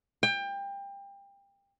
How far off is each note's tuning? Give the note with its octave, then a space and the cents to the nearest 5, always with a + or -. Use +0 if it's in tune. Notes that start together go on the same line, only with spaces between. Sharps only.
G5 +25